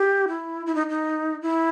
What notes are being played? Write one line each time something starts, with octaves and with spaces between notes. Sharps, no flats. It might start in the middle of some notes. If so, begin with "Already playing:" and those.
Already playing: G4
E4
E4
D#4
D#4
E4